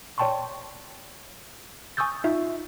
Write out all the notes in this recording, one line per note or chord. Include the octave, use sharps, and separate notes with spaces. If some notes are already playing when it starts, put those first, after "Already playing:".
C#5 D5 G5 A5 C6 C#6
G#5 C#6 D#6 E6 G6 A6
D#4 F4 E5